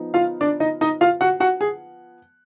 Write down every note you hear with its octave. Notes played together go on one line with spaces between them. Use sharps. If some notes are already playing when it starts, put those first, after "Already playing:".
Already playing: F3 B3 D#4
F4 F5
D4 D5
D#4 D#5
D#4 D#5
F4 F5
F#4 F#5
F#4 F#5
G#4